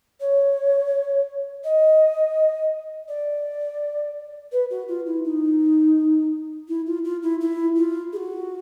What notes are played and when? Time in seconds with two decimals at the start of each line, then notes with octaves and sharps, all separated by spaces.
0.20 C#5
1.64 D#5
3.08 D5
4.52 B4
4.70 F#4
4.88 F4
5.06 E4
5.24 D#4
6.68 E4
6.86 F4
7.04 F4
7.22 E4
7.40 E4
7.76 F4
8.12 G#4
8.16 F#4